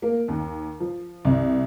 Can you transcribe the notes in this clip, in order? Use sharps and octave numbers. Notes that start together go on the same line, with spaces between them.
A#3
D#2
F3
C2